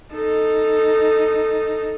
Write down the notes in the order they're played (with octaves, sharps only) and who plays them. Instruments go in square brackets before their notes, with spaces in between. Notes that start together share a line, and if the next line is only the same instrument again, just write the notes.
[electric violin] D#4 A4